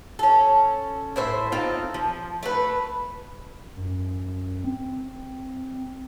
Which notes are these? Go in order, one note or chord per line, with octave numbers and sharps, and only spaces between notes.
C#4 A4
A2 C5 E5
C4 D#4 F4 A4
F3
A3 B4
F#2
C4